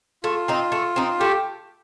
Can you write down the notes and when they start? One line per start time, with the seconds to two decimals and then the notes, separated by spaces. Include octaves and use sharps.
0.24 A3 F4
0.48 C4 D#4
0.72 A3
0.96 C4 D#4
1.20 A3 G4